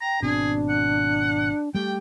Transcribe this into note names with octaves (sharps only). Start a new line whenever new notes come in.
G5 A#5
G#1 B2 C4 D4 G#4
F#5
G3 A3 G4 G5